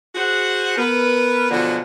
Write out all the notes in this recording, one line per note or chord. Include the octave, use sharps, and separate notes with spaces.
F#4 G#4 C5 F#5
B3 A#4 B4
B2 D3 F3 F#3 G#3